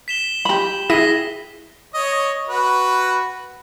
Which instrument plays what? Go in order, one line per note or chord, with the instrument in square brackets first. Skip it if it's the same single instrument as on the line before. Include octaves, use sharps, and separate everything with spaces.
[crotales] B6 E7 G7
[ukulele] G4 B5
[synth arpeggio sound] E4 D#7 [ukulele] G#4 [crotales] A#6 B6 G7
[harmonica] C#5 D#5
F#4 B4